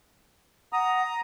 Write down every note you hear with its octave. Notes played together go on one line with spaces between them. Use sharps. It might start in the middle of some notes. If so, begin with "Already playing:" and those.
F#5 A#5 D#6